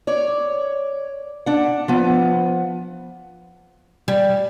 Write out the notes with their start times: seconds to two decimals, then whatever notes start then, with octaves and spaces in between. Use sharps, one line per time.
0.07 C#5 D5
1.46 D4 F#5
1.88 F3 B3
4.08 G3